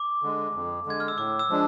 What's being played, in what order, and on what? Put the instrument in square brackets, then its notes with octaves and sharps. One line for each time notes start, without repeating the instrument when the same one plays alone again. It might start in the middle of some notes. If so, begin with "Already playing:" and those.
Already playing: [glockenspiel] D6
[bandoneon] D3 G#3
F2
[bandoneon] D3 G#3 [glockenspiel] G#6
[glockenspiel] F6
E6
[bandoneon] A2 [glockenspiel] D6
[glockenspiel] E6
[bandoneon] F3 G#3 D4